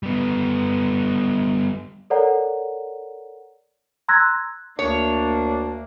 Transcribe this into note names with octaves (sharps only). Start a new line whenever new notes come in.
G3 B3
A4 A#4 C#5 D5 F#5 A#5
A#5 C6 E6 F#6 G#6 A#6
D2 A#3 D4 C#5